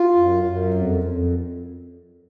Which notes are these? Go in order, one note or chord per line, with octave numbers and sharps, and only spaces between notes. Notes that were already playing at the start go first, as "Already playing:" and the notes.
Already playing: F4
F#2
F#2
F2
F2